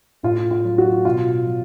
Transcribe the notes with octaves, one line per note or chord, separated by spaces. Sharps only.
A2 F4
F4
F#3
F#4
B2 F4
F#3